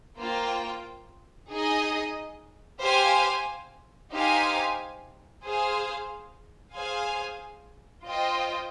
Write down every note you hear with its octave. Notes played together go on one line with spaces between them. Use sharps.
A#3 F4 C5 G5
D#4 G#4 D#5
G4 C5 F5 G#5
D#4 G4 C5 F5 G#5
G#4 C5 F5
G#4 C5 F5 G#5
F4 C5 D#5 G5